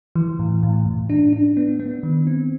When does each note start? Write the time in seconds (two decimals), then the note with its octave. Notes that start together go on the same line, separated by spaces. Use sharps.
0.16 E3
0.39 A2
0.63 A2
0.86 A2
1.10 D4
1.33 D4
1.57 B3
1.80 B3
2.03 D#3
2.27 C4